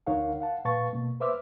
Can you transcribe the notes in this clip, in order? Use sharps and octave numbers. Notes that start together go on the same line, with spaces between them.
D2 D#4 A#4 C#5 F5 F#5
F5 F#5 A5
A#2 B4 F5 A5 C#6 A6
B2 A#3
B4 C5 E5 D6 E6 F6